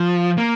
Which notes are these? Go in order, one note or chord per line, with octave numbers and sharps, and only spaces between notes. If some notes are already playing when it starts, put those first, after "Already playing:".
Already playing: F3
A#3